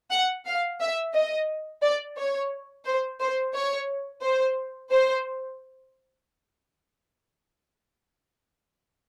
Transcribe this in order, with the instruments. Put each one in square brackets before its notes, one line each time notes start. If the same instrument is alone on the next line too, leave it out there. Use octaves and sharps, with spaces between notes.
[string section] F#5
F5
E5
D#5
D5
C#5
C5
C5
C#5
C5
C5